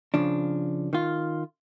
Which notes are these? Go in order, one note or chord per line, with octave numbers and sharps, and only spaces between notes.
C#3 F3 D4
D#3 F4